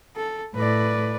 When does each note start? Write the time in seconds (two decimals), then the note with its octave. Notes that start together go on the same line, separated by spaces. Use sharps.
0.17 A4
0.55 A2 B4 D5